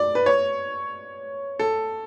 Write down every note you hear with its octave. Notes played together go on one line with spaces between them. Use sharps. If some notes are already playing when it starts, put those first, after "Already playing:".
Already playing: D5
B4
C#5
A4